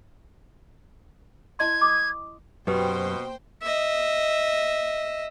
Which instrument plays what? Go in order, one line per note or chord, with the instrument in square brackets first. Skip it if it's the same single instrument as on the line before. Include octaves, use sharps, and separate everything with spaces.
[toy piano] E4 D#5 C6 [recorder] G#6
[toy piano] D6 D#6
[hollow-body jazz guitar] F#2 [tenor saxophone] B2 [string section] A#3 C5 G5 [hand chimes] G4 B4
[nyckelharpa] D#5 E5